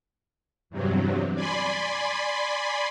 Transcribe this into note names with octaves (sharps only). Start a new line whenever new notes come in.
E2 G2 C3 F#3
D5 G#5 B5 C6